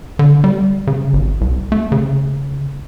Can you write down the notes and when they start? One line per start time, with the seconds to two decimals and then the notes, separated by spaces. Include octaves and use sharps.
0.19 D3
0.44 G3
0.87 C#3
1.13 G#1
1.41 C2
1.72 A3
1.92 C#3